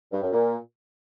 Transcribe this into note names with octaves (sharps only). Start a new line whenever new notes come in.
G2
F#2
A#2